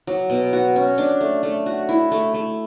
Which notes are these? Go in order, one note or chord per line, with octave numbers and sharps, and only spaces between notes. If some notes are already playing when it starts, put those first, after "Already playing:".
F#3
B2
F#4
C#4
D4
A3
A3
F#4
E4
A3
A3